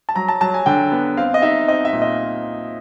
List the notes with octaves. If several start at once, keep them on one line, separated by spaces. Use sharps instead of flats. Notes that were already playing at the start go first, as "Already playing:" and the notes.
A5
F#3 A#5
A5
F#3 A5
G#5
D3 G5
B3
C4 F5
D#5
D#4 E5
C4 D#5
E5
A#2
D#5